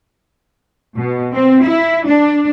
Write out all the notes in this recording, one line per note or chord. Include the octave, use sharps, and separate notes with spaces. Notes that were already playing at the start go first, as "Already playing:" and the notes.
B2
C4
E4
D4